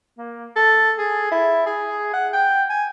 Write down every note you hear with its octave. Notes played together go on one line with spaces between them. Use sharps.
A#3
A4
G#4
E4
G#4
F#5
G5
G#5